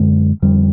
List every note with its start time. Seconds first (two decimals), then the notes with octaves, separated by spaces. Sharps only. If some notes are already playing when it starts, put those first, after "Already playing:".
Already playing: F#2 D3 G#3
0.42 F2 D3 G3